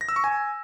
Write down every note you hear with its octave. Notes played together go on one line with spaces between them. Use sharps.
A#6
E6
C#6
G#5